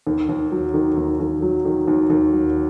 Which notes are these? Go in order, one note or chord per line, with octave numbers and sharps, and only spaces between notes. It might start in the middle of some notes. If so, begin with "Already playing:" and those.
D#2
D#2
F#3
D#3
D#2
D#2
F#3
D#3
D#2
D#2
F#3